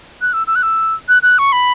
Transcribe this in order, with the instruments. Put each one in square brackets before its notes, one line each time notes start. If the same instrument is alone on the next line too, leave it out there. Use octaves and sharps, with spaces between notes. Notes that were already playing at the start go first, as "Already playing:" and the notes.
[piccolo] F#6
E6
E6
F#6
E6
F#6
F#6
C#6
B5